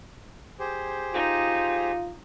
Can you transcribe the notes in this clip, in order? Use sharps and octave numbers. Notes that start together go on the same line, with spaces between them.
G4 G#4 C5
D#4 F4